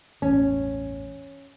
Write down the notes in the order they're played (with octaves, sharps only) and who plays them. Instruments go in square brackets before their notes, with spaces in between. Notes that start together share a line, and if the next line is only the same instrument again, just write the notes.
[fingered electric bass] A1 E2 G2 [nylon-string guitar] C#4